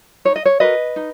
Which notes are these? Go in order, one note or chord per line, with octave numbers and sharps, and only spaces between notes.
D#4 C#5
D#5
C#5
F#4 A#4 B4 D#5
D#4